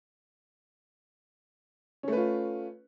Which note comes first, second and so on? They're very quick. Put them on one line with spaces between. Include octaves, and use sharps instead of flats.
C#4 A3 B4 F4